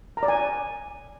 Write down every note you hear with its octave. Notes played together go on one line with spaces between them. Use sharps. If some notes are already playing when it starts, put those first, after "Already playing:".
A#5
D5
G#5